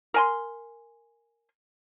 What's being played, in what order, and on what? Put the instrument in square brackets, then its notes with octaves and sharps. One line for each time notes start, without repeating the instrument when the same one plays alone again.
[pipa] A#4 G#5 C6